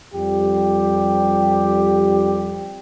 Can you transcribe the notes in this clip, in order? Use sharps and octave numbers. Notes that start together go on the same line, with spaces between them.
F2 G3 G4